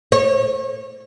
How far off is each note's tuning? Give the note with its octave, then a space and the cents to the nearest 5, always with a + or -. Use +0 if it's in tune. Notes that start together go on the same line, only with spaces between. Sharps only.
C#5 -30